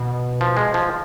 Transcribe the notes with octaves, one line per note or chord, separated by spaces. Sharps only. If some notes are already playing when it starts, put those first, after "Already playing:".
Already playing: B2
F3
G#3
F3